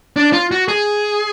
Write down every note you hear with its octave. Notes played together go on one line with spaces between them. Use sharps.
D4
F4
F#4
G#4